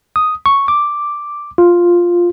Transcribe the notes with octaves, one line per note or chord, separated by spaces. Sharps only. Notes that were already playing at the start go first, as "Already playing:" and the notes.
D#6
C#6
D6
F4